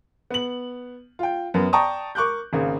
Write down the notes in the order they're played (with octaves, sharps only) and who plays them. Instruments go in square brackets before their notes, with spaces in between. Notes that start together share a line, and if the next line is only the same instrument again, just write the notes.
[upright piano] B3 F#7
F4 G5
F#2 B3 A#4
D5 G5 A5 A#5 C#6 D#6
A#4 C#6 D6 F#6 G6
G#1 C#3 A#3